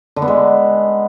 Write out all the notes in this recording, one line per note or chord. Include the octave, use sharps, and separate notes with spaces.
D3
B3
G#3